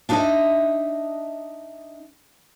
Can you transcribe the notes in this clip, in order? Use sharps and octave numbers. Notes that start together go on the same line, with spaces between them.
D4 D#4 F#4 B4 D#5 E5